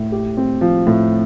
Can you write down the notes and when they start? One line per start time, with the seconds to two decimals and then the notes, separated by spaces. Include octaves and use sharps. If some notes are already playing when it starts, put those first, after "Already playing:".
Already playing: A2
0.12 G4
0.37 C4
0.61 F3
0.87 A2